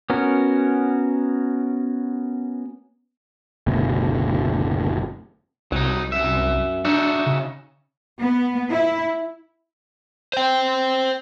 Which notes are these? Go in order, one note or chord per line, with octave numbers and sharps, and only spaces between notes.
B3 C#4 F#4 A#4
F#1 D2 B2
C2 F#3 D#4
F#2 E5
D4 D#4 F#4 E5
C#3
B3
E4
C5 G5